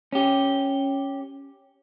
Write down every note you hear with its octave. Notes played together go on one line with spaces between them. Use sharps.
C#4 G4